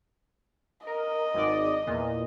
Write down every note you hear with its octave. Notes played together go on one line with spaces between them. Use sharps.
A#4 D#5
G#1 G#2 D5
E2 A#2